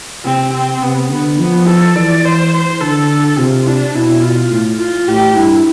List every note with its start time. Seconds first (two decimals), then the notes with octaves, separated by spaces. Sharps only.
0.25 C3 C4
0.53 C4
0.82 C3 B3
1.11 D3 B3
1.39 F3 B3
1.67 A4
1.96 E3 D5
2.25 C5
2.53 C5
2.81 D3 A4
3.38 C3 F4
3.67 D4
3.94 B2 E4
4.22 F4
4.51 A2
4.79 F4
5.08 A2 G4
5.36 G2 E4